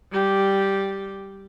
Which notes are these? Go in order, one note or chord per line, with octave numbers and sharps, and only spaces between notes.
G3 G4